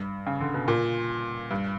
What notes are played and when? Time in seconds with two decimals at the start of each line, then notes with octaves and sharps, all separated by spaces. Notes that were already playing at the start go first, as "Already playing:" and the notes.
Already playing: G2
0.27 C#3
0.41 D3
0.54 B2
0.68 A#2
1.51 G2